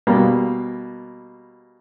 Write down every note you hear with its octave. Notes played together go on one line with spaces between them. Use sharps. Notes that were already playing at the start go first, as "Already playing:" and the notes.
B2 G3 A#3